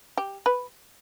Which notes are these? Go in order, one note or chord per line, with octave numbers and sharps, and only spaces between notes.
G4
B4